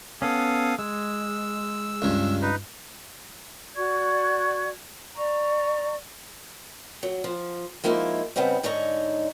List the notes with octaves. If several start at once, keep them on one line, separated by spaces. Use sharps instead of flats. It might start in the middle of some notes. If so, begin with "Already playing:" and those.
B3 C#4 A4 F5 D#6
G#3 E6
C#2 G2
D#4 B4
F#4 D5 C#6 G#6
D5 A#5 C#6
F#3
F3
F3 G#3 A#3 D#4 E4
C#3 G3 B3 C4 D#4
G#2 D3 D#4 C#5 A#5